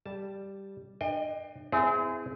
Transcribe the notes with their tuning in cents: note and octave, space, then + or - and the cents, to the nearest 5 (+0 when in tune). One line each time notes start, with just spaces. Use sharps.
G3 +0 A5 +0
D4 +40 D#5 +0 G5 +25
C4 -35 E4 +0 G#4 +0